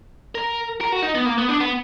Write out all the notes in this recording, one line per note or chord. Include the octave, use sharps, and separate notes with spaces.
A#4
A#4
F#4
D#4
B3
A#3
B3
D4
B3